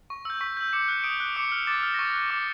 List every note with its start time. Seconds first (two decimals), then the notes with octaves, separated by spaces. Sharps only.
0.10 C#6
0.25 E6 G6
0.41 C#6 B6
0.57 E6 G6
0.73 D6 C#7
0.88 F#6
1.04 D#6 D7
1.20 F#6
1.27 D7
1.35 D6 C#7
1.52 F6
1.67 D6 A6
1.83 F6
1.94 A#6
1.99 C#6 A6
2.14 F#6
2.30 D6